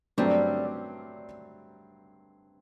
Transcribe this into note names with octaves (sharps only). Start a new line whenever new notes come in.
G2 F#3 G3 A3 C4